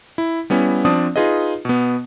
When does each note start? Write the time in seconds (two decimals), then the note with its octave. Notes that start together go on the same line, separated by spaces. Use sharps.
0.18 E4
0.50 G3 B3 C#4 E4
0.85 F3 C4 D4 D5 D#6
1.16 D#4 F4 G#4 B4 D#5
1.65 B2 B3